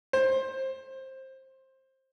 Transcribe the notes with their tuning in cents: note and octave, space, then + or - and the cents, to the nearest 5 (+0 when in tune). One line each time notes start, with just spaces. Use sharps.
C5 +15